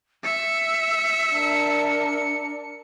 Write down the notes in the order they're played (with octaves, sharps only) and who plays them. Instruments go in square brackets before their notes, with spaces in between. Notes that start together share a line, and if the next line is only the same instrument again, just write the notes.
[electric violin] E5 [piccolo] C#7
[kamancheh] D4 A#4